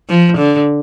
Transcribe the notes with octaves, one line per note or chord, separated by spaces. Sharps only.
F3
D3